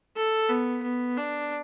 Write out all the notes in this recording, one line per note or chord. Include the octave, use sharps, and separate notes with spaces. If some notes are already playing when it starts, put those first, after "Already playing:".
A4
B3
B3
D4